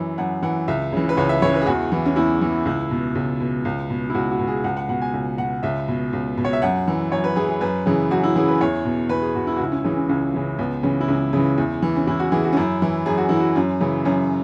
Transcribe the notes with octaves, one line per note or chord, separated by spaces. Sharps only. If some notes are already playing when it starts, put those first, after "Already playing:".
Already playing: F#2 E3
F#2 F#5
E3 F#5
C#2 E5
C#3 E3
B4
C#2 C#5
E5
C#3 E3 C#5
B4
G#4
E2 F#4
E3
C#4
E2 E4
E3
C#2 E4
B2
C#2
B2
C#2
B2
E4
C#2 F#4
F#4
B2
G#4
C#2 F#5
F#5
B2 F#5
G#5
C#2
B2 F#5
C#2 E5
B2
C#2
B2
C#5
E5
F#2 F#5
E3
F#2 C#5
B4
E3 G#4
G#4
F#2 B4
C#3 E3 G#4
F#2 F#4
E4
C#3 E3 G#4
B4
E2 C#5
B2
E2 B4
G#4
B2 F#4
E4
F#4
C#2 E4
C#4
C#3 E3 C#4
C#4
C#2 C#4
C#3 E3
C#2 B3
C#3 E3 C#4
E4
C#2 C#4
C#3 E3
E2
E3
C#4
E2 E4
F#4
E3 G#4
F#4
C#4
F#2 E4
E3
F#2 G#4
F#4
E3 E4
F#4
F#2 C#4
C#3 E3
F#2 C#4